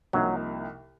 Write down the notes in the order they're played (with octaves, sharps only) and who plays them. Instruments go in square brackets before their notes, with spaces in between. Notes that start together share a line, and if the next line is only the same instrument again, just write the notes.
[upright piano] C2 C3 F3 A#3 D#4 [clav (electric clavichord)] F#3